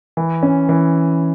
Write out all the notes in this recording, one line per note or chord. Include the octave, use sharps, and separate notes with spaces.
E3
C#4
E3